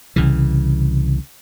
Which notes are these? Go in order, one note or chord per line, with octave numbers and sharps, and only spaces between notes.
C2 C#3 E3